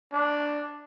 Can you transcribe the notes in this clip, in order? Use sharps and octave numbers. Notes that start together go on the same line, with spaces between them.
D4